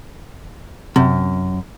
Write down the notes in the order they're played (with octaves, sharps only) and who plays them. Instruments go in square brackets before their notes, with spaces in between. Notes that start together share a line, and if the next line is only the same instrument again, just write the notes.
[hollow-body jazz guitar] F#2 [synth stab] C3